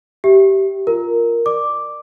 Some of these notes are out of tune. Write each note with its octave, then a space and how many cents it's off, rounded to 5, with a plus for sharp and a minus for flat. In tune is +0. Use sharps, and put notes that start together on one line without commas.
G4 -20 E5 +0
F4 +0 A#4 +0
D5 +20 D6 +0